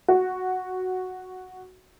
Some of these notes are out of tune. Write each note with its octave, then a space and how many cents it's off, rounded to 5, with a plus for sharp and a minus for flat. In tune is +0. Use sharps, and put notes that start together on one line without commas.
F#4 -5